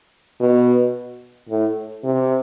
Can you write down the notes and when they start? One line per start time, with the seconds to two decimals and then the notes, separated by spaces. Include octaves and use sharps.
0.41 B2
1.49 A2
2.04 C3